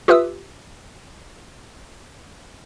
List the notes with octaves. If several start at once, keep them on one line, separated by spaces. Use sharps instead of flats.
F4 G4 B4 E5 D#6 E6